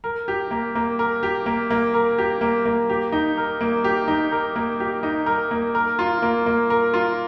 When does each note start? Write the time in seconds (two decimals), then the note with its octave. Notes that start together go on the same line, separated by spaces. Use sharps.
0.04 A#4
0.28 G4
0.51 A#3
0.75 A#3
0.99 A#4
1.23 G4
1.46 A#3
1.70 A#3
1.94 A#4
2.18 G4
2.41 A#3
2.66 A#3
2.89 G4
3.12 D#4
3.37 A#4
3.61 A#3
3.84 G4
4.08 D#4
4.32 A#4
4.56 A#3
4.80 G4
5.03 D#4
5.26 A#4
5.51 A#3
5.75 A#4
5.99 F4
6.22 A#3
6.46 A#3
6.70 A#4
6.94 F4